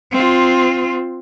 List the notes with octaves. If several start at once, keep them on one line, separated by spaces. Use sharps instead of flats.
C4 F4